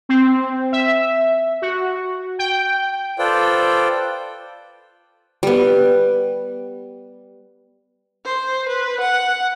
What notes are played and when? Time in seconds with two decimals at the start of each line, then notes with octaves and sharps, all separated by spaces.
0.09 C4
0.72 E5
1.62 F#4
2.39 G5
3.19 F4 A4 B4 C5 D5 G5
5.43 G3 B3
8.25 C5
8.68 B4
9.00 F#5